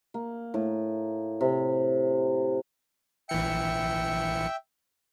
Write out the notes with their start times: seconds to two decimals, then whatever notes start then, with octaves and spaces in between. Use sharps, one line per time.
0.14 A#3
0.54 A2
1.41 C3
3.29 A#1 E3 E5 G5 C#7